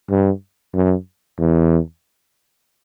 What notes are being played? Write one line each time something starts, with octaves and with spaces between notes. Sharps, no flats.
G2
F#2
E2